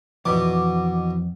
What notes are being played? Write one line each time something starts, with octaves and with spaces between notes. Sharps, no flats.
F2 B2 E3 F4 D5 D6